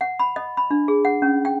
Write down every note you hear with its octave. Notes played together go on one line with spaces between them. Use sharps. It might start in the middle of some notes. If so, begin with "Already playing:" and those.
F#5
B5
D#5
B5
D4
G#4
F#5
C#4
G5